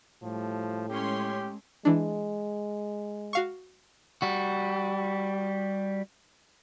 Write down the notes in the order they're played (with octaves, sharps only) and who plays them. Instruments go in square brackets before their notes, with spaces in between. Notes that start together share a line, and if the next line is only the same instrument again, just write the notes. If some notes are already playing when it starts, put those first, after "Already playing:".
[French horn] A2 [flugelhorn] F3 [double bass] G3 A3
[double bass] G#3 A3 [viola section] C#4 C#5 C6 [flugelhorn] G4
[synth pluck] E3 D4 [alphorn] G#3
[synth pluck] F#4 F5 C#6
[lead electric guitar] G3 F#4